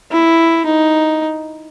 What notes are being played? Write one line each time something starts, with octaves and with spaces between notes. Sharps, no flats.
E4
D#4